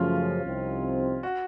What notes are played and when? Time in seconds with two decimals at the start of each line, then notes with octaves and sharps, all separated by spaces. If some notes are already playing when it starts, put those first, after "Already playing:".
Already playing: F#2 C#3 F3 A3 C#4 F4
0.43 C2 C3 F3 C4 D#4
1.23 F#4